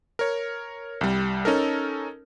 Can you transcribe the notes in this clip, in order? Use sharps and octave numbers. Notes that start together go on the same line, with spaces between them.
A#4 C#5
C2 G3
C#4 D#4 A4 A#4